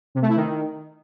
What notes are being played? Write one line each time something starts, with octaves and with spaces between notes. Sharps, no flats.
C3
A3
E4
D#3